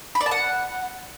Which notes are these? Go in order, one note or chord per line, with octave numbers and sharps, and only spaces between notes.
B5
D5
A5
F#5